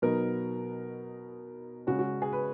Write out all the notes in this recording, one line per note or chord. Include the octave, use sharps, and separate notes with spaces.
B2 F#3 B3 D#4 A#4
C#3 G#3 C#4 F#4
F#4
G#4
B4